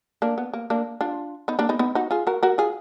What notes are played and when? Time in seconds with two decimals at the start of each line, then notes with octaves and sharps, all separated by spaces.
0.22 A#3 D4
0.38 B3
0.53 A#3
0.70 A#3 D4
1.01 D4 F4
1.48 B3 D#4
1.59 A#3 D4
1.69 B3 D#4
1.79 B3 D#4
1.95 D#4 F#4
2.11 F4 G#4
2.27 F#4 A#4
2.43 F#4 A#4
2.58 F4 G#4